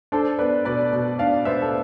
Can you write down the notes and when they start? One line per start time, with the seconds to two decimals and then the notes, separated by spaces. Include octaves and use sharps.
0.12 D4 A4 C5
0.39 B3 B4 D5
0.65 B2 B4 D5
0.93 B2
1.19 D4 D5 F5
1.45 B3 C5 E5
1.62 A4